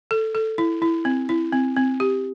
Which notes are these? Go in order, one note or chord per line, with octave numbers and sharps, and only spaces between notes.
A4
A4
E4
E4
C4
E4
C4
C4
G4